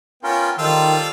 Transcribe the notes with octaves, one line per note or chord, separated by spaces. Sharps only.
B3 C#4 F4 A#4 G5
D#3 G3 F4 A4 C5 E6